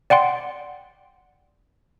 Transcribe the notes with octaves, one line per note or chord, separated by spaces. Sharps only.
D5 F#5 G5 C6